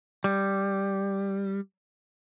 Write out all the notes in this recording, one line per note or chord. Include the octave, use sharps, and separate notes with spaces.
G3